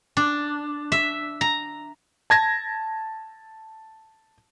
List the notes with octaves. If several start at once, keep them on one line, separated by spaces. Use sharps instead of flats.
D4
E5
A#5
A5 G#6 A#6